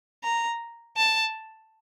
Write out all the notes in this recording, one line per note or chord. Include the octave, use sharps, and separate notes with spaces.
A#5
A5